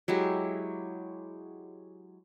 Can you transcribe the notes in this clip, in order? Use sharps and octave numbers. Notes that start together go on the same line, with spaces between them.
F#3 G#3 E4 G4